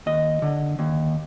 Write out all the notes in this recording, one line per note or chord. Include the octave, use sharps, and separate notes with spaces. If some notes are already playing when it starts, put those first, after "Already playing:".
D#2 D#5
D3
D#2